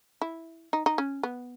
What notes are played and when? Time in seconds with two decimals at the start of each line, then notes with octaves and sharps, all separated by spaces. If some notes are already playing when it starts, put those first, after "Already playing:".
0.21 E4
0.73 D#4
0.86 D#4
0.98 C#4
1.23 B3